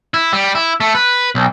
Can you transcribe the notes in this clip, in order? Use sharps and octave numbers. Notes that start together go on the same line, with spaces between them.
E4
G3
E4
A3
B4
B1